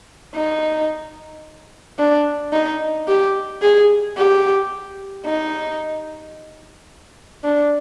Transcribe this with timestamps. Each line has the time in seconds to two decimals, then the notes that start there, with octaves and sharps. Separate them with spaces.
0.35 D#4
1.99 D4
2.53 D#4
3.08 G4
3.62 G#4
4.18 G4
5.26 D#4
7.44 D4